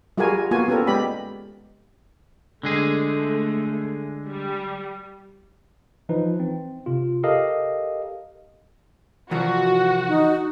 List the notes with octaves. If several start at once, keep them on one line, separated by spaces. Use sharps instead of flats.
G3 F4 F#4 G#4 A#4 G#5
A#3 B3 F4 F#4 G#5
B3 C#4 G4 A4 A#4
G#3 B3 G4 D5 B5
D3 G#3 A3 G#4
G3
E3 F3 D#4 B4
C4
C3 F4
G4 A4 A#4 D#5 F5 D#6
C2 E3 F3 F#4
D#4